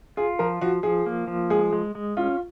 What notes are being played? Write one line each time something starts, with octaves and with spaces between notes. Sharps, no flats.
F4 G#4
F3 A#4
F3 F#4
F3 G#4
A#3
F3
G#3 G#4
G#3
G#3
C#4 F4